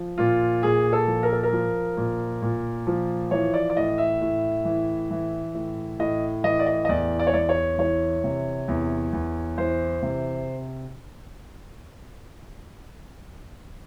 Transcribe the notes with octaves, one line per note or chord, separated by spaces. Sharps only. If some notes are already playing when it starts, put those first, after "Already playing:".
Already playing: F3
A#2 F4
A#2 G#4
A4
F3
A#4
A4
A#4
F3
A#2
A#2
F3
E3 C#5
D5
D5
A2 D#5
E5
A2
E3
E3
A2
A2 D#5
E3 D#5
D5
D#5
D#5
E2 D5
D5
C#5
E2 D5
C#5
E3 C#5
C3
E2
E2
E3 C5
C3